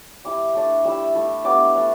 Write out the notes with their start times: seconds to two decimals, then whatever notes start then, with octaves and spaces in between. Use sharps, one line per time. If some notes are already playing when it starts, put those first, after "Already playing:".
0.24 G3 E4 D6
0.54 A3 D4
0.85 G3 E4 E6
1.15 A3 E4
1.45 G3 B3 D4 D6
1.75 A3 D4